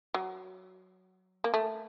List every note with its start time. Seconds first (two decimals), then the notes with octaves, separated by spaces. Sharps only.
0.14 F#3
1.44 A#3
1.54 A3